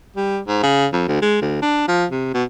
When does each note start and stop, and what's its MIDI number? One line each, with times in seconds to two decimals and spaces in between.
0.16 0.39 55
0.48 0.61 44
0.63 0.87 49
0.93 1.05 41
1.08 1.19 38
1.22 1.39 56
1.42 1.59 38
1.62 1.88 62
1.88 2.05 53
2.11 2.33 48
2.34 2.44 47